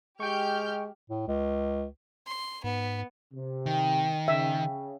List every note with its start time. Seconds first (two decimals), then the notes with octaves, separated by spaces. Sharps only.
0.20 G#3 G4 G5 C#6 F6 G6
1.10 A2
1.28 C#2
2.27 C6
2.64 G#2 B3
3.33 C3
3.66 D#3 G5
4.28 C#3 E5